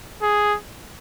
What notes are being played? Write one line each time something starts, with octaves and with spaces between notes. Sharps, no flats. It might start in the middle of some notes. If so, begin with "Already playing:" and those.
G#4